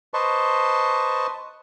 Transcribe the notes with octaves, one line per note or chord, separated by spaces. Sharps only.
B4 C5 D#5 A5 C6 C#6